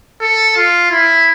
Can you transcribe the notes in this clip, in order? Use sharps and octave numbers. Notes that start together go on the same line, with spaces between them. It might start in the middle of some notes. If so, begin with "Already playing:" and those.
A4
F4
E4